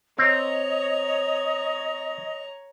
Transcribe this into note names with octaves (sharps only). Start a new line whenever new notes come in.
C4 C#5 D#5 A#5